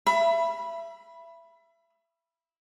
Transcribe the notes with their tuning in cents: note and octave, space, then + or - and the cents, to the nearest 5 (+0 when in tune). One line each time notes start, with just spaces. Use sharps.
E5 +30 B5 -10